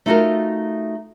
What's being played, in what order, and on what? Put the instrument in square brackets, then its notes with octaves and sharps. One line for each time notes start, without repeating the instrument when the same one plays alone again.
[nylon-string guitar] A3 D#4 F4 F#4 A4 A#4